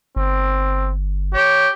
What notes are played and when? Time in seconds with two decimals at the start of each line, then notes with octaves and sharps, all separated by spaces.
0.16 G1 C4
1.34 G4 C#5